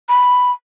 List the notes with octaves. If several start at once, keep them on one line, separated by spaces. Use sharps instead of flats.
B5